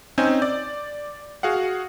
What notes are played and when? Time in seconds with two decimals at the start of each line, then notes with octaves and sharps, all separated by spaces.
0.18 C4 C#4 D#4 G#5 G6
0.42 D5
1.43 F#4 G#4 F5 F#5